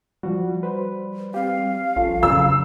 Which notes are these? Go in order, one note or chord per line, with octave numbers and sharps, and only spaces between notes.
F3 G3 F#4
B4 C5
C4 G4 F5
A#1 C#4 F4 A4
F2 C#3 F#3 E6